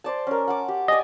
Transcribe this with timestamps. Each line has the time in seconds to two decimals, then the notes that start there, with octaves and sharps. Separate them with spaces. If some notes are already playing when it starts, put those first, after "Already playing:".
0.04 C5 D5 A5
0.27 C#4 A#4
0.47 F#5 A5 D6
0.68 G4
0.88 D5 D#5 G#5